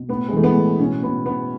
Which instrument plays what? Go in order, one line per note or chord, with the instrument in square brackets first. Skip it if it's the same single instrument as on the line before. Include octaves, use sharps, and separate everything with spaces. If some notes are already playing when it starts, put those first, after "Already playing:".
Already playing: [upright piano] B2
A2 B3
G#3
E3 A3
B3
A2
B2 C#4
B2 B3
B2 B3